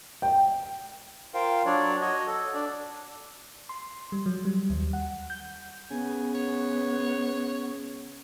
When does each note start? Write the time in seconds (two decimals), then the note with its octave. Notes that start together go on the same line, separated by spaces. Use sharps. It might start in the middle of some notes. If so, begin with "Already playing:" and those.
0.22 G5
1.34 F4 A#4 C5 F5 G5
1.66 F#3 D4 C#5 D5
2.01 F#4 C#5 D#5
2.27 A4
2.54 D4 D5
3.69 C6
4.12 G3
4.26 F#3
4.45 G3
4.70 D#2
4.93 F#5
5.30 G6
5.91 C#3 B3 G#5
6.35 C#5